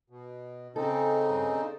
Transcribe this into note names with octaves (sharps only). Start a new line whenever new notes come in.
B2
C#3 C4 D#4 A4
G2
C5 D5